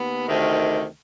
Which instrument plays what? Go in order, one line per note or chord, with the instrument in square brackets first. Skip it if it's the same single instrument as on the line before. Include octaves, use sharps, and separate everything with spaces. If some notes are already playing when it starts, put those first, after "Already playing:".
Already playing: [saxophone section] D#2 B3
D2 C3 D#3